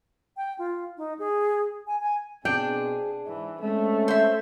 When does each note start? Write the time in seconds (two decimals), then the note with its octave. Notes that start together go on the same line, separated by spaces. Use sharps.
0.37 G5
0.58 F4
0.97 D#4
1.19 G#4
1.87 G#5
2.01 G#5
2.45 B2 C4 D4 G#4 G5
3.27 G#2 E3
3.61 G#3 A3 C4 C#4
4.08 C5 E5